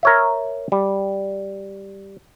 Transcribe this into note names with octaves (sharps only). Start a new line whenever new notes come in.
A#4 C#5 E5
G3